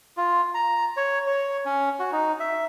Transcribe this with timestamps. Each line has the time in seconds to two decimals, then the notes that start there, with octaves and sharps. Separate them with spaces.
0.17 F4
0.54 A#5
0.97 C#5
1.27 C#5
1.65 C#4
1.99 F#4
2.12 D#4
2.40 E5